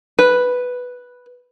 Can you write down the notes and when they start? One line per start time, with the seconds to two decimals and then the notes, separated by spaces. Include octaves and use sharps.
0.19 B4